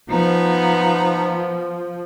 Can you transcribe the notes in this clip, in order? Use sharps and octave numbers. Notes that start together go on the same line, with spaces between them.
F3 B3 D#4